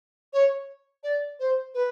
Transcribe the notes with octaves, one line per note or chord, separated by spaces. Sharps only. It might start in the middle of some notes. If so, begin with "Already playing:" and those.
C#5
D5
C5
B4